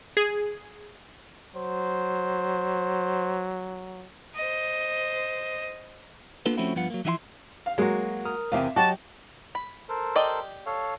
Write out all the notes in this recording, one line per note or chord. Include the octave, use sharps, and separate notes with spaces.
G#4
F#3 C5
C5 D#5
A#3 B3 D4 F4 A4 B4
F3 A3 C4 C#4 E4 F#4
G2 F3 B3 F4 F#5
F#3 A#3
E3 F3 E4 F5 C6
F5
F#3 G#3 A#3 F#4
A#4 D#6 F6
E2 C3 G4 E5 F5
F#3 F#4 G4 D#5 A5
B5
A4 A#4 C5
G4 D5 D#5
A4 C#5 F5